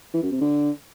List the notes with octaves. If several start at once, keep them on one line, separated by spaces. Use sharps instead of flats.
E3
F#2
C3
D3